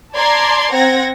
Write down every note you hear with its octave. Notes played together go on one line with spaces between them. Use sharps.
D5 A5 A#5 C6 G#6
C4 F#5 G#6 A#6